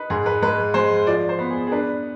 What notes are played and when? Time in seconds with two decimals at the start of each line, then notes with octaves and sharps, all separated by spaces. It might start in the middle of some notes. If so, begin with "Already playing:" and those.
Already playing: D#4 B4
0.10 G#2 G#4
0.26 B4
0.42 G#3 B4
0.74 G#3 C5
1.07 F3 D5
1.29 C5
1.39 B3
1.50 G#4
1.67 G#4
1.72 D4 B4